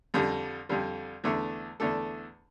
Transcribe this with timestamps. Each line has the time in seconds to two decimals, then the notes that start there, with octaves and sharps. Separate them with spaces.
0.14 F2 D3 G3
0.69 F2 D3 G3
1.24 E2 D3 A3 D4 A4
1.80 E2 D3 A3 D4 A4